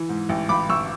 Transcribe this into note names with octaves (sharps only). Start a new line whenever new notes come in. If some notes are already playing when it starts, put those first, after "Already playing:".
Already playing: E3
G#2
A1
A1 B5 D6
A1 C#6 E6